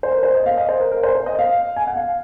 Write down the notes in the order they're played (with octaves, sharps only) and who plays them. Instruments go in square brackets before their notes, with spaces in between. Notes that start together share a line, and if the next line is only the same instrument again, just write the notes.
[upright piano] C5
A#4
C5
D#5
F5
D#5
C5
A#4
A#4
C5
C5
D#5
F5
G#5
F#5
F5